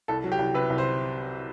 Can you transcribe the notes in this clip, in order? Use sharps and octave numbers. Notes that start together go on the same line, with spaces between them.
C2 A4
F#3
G4
C2
C3 B4
C2
C5